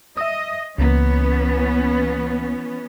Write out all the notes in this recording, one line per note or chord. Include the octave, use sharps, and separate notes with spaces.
D#5 E5 D#6
C#2 E3 A#3 B3 C#4